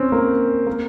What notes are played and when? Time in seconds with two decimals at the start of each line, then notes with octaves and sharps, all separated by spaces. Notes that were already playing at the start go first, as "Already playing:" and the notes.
Already playing: C4 C#4
0.12 A#3
0.67 A#3